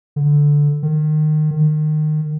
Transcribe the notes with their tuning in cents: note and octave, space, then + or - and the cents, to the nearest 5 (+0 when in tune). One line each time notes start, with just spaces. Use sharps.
D3 -5
D#3 -25
D#3 -25